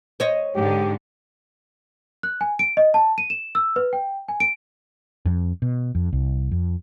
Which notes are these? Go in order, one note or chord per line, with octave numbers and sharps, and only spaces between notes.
C5 C#5 D#5
G#2 D3 G4
F#6
G#5
D7
D#5
A5
D#7
E7
E6
B4
G5
G#5
D7
F2
B2
F2
C2
F2